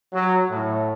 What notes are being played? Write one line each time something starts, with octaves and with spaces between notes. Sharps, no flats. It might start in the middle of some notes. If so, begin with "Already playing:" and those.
F#3
A2